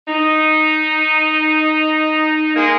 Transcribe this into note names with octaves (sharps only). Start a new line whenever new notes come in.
D#4
G#3 A#3